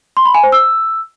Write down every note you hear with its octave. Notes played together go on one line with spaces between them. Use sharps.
C6
B5
G#5
C5
E6